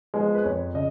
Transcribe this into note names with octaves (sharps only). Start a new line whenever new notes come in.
F3 G#3 B3
B4
F2 C#5
C#3 D#5